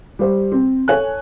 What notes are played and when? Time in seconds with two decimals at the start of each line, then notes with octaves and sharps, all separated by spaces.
0.19 G3 C5
0.52 C4
0.88 A4 C#5 G#5 F#6